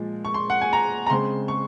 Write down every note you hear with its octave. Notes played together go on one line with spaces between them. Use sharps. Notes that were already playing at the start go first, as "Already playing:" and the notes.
Already playing: A#2 F3 G#3
C#6
C6
F#5
G#5
A#5
A#5
C#3 G#3 C4 C6
C#6